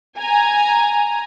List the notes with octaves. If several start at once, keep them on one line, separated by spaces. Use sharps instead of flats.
G#5 A#5